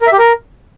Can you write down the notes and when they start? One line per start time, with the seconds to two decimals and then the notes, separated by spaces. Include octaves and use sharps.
0.01 A#4
0.07 E5
0.13 G4
0.19 A#4